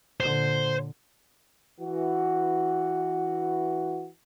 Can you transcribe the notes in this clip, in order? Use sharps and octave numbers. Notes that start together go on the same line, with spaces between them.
A#2 D3 C5
E3 F#4